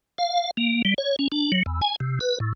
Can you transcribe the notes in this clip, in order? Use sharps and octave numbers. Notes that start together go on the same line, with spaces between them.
F5
A#3
G3
C#5
C#4
D4
F#3
E2
G#5
C3
B4
A2